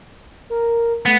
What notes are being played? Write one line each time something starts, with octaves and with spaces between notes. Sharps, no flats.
A#4
A3 B3